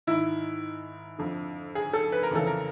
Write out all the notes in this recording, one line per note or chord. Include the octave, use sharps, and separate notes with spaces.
G#2 D#3 E4
F2 D3
G#4
A4
B4
A#4
F2 C#3 E3 A4
A#4